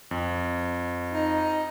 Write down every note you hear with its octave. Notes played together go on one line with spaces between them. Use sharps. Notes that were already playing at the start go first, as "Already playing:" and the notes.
F2
D#4